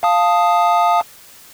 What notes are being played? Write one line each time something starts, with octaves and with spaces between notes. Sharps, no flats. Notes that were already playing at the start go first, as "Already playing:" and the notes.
F5 A5 D#6